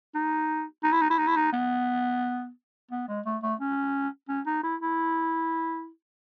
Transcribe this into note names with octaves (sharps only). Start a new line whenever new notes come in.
D#4
D#4
E4
D#4
E4
D#4
E4
D#4
B3
B3
G#3
A3
A3
C#4
C#4
D#4
E4
E4